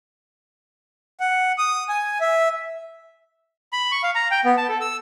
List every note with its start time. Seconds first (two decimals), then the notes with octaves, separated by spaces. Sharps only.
1.20 F#5
1.58 D#6
1.89 G#5
2.21 E5
3.73 B5
3.92 C#6
4.03 F5
4.15 A#5
4.31 G5
4.45 B3
4.57 A5
4.69 A4
4.81 E6